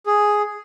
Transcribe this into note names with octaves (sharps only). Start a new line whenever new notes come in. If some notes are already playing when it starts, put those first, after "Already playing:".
G#4